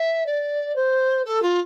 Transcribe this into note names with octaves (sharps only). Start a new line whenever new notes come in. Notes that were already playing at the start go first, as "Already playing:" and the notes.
Already playing: E5
D5
C5
A4
F4